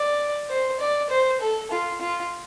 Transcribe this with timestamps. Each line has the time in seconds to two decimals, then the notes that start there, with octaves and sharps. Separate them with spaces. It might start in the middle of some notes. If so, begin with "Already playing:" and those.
Already playing: D5
0.49 C5
0.80 D5
1.10 C5
1.41 A4
1.71 F4
2.01 F4